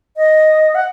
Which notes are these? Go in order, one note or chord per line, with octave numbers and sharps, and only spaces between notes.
D#5
F#5